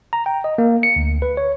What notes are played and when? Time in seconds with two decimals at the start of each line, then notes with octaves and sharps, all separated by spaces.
0.13 A#5
0.26 G5
0.44 D#5
0.58 A#3
0.83 C#7
0.96 D2
1.22 B4
1.37 C#5